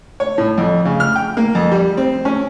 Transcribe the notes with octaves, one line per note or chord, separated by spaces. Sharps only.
C#5
A2
F2
C#3
F6
G5
A#3
F2
G3
C4
C#4